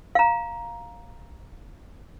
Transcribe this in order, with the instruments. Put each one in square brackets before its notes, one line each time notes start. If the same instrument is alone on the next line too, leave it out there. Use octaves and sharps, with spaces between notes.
[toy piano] F5 A#5